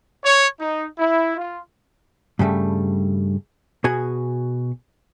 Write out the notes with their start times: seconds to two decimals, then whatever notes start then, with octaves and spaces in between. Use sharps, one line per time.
0.24 C#5
0.59 D#4
0.98 E4
1.37 F4
2.39 G2 C#3 G3 A3
3.84 B2 F#4 G#4 G#5